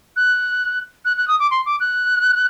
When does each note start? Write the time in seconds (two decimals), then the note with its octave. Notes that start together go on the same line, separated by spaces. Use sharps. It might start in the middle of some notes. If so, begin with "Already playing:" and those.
0.16 F#6
1.05 F#6
1.17 F#6
1.28 D#6
1.40 D6
1.51 C6
1.66 D6
1.80 F#6